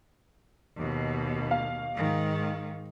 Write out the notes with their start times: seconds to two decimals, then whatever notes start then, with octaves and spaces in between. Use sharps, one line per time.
0.77 D#2 B2
1.51 F5
1.94 G#2 D#3